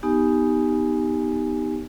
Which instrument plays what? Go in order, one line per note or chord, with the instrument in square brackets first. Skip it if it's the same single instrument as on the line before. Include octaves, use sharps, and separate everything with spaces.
[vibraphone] B3 D#4 G4 G#5